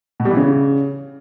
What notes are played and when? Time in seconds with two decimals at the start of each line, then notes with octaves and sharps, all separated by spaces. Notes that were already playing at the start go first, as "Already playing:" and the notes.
0.20 B2
0.25 G3
0.31 E3
0.37 C#3